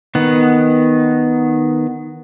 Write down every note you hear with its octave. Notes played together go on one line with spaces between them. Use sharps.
D#3 B3